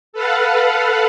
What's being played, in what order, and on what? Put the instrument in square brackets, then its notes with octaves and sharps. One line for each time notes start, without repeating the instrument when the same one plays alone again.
[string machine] A4 B4 F5 F#5